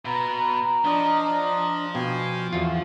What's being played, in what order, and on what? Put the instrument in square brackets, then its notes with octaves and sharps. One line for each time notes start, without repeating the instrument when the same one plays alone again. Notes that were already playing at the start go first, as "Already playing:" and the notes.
[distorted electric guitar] B2 [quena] A#5
[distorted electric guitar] F3 [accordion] D4 D#5
[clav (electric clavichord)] B2 [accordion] F5 G5 G#5
[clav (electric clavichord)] E2 F4 [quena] F#4